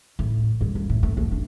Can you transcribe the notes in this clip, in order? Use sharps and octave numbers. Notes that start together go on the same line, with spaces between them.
A2
G2
G2
A2
A3
A3
D4